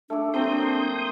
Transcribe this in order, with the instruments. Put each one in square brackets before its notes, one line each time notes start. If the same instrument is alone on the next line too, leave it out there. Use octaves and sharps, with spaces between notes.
[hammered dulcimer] A3 G#5 D6 [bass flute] D4 [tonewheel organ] A4
[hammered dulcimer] F#3 A#3 C5 [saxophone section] C4 [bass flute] D4 [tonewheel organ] C6 D#6 G6